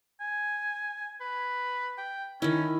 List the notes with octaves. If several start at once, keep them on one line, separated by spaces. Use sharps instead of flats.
G#5
B4
G5
D#3 C#4 E4